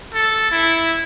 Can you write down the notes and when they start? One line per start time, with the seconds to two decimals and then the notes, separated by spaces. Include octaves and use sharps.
0.14 A4
0.52 E4